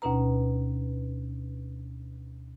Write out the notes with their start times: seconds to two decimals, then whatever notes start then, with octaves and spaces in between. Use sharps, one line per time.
0.02 D2 B2 C#4 D#4 B4 A#5